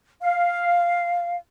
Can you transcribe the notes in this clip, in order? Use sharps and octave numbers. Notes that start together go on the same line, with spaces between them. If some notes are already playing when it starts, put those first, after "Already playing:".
F5